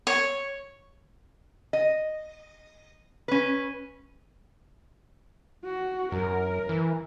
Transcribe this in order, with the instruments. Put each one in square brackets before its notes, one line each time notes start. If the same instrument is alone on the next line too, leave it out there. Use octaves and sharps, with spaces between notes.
[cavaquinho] C#5
[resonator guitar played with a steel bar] D#5
C#4 B4
[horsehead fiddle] F#4
[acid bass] F#2 [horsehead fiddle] A#4
[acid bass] E3